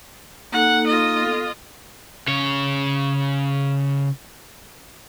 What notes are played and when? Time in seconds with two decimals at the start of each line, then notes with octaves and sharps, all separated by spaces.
0.52 A#3 D#4 A4 F#5
0.87 F4 D#5
1.20 B3 A4
2.28 C#3 C#5